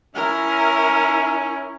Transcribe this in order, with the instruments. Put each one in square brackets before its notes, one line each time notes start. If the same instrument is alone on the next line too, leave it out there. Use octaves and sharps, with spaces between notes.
[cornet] C#4 [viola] E4 A#4